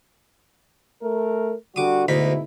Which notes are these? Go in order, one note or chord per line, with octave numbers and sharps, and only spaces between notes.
A3 A#4
D3 G3 F#4 D6 D#6
D2 G#2 B2 D#4 E4 B5